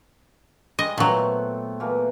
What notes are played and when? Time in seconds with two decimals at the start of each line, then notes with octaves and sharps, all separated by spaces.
0.79 G3 G#3 D#5
0.98 A#2 F#3 A3 B3 C4
1.80 B2 E3 A#3